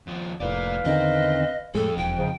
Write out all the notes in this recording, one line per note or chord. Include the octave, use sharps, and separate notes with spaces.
D#2 F3
F1 A2 A#3 B4 D5 F5
E2 D3 D#3 C4 D#5
F2 A2 G#3 A4
E1 G5
G#2 C#3 F3